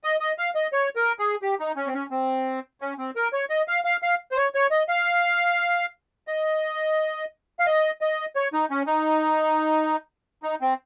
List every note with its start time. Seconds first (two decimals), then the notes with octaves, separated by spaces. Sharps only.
0.04 D#5
0.20 D#5
0.38 F5
0.55 D#5
0.73 C#5
0.96 A#4
1.19 G#4
1.42 G4
1.60 D#4
1.76 C#4
1.87 C4
1.94 C#4
2.11 C4
2.81 C#4
2.98 C4
3.16 A#4
3.33 C#5
3.50 D#5
3.68 F5
3.85 F5
4.03 F5
4.32 C5
4.37 C#5
4.55 C#5
4.71 D#5
4.89 F5
6.28 D#5
7.59 F5
7.66 D#5
8.01 D#5
8.36 C#5
8.53 D#4
8.71 C#4
8.87 D#4
10.43 D#4
10.61 C4